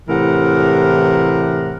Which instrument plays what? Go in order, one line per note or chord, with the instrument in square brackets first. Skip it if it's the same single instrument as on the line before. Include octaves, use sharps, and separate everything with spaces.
[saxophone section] A2 C3 E3 A#4 F#5